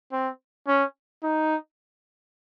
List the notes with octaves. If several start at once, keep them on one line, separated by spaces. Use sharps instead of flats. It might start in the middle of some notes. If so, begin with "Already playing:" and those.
C4
C#4
D#4